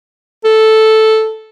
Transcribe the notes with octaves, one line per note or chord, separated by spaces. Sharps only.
A4